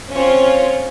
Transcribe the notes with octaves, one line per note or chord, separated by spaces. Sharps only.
C4 C#4 F4 C#5